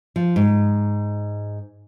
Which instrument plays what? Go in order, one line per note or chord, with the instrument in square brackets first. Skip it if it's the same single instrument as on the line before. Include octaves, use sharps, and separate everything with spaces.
[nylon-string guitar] F3
G#2